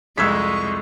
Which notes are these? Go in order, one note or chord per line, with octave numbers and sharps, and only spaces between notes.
C2 F2 G#3 C#6 E6 G#6 B6